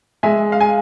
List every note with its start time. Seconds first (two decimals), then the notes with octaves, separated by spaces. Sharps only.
0.23 G#3 E5 G#5
0.52 F5
0.61 G#5